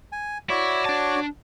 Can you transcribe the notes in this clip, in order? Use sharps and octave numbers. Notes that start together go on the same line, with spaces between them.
G#5
E4 F#4 C#5 D5
D4 A5